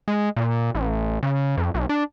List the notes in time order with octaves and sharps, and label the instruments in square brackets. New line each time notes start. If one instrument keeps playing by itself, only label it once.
[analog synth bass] G#3
A#2
A1
C#3
F2
B1
D4